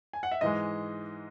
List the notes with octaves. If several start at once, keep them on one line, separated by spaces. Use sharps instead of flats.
G#5
F#5
E5
G#2 E3 G#3 D#5